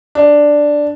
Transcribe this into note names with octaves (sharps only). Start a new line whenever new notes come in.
D4